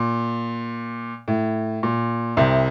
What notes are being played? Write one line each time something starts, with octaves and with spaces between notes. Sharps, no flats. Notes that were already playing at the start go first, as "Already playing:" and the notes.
Already playing: A#2
A2
A#2
C2 C3